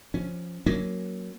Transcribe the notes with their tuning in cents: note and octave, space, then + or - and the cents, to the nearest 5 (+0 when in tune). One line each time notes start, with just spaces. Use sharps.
F3 +0 C#4 +0
F#3 +0 A#3 +0 C#4 +0